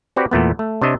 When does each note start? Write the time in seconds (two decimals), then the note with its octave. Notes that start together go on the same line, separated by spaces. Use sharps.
0.16 C4 F#4 G4 B4 D5
0.31 E2 A#2 A3 B3
0.59 A3
0.82 C3 D4 C#5 D#5 E5